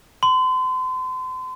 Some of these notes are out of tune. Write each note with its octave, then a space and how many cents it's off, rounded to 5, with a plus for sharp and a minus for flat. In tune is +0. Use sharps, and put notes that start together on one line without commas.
C6 -40